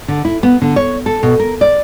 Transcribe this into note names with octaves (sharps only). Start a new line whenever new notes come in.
D3
E4
B3
D3
C#5
A4
B2
A#4
D5